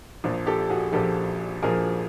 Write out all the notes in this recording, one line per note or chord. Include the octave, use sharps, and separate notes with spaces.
A#1 A#2 F3
G4 A4
F#4 G#4
A#1 A#2 F3 G4 A4
A#1 A#2 F3 G#4 A#4